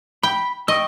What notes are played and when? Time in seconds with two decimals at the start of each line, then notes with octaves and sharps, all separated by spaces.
0.23 G5 B5
0.68 D#5 G5 C#6 E6